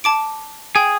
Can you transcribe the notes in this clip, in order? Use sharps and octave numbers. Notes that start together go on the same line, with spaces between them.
A5 D6 D7
G#4 G5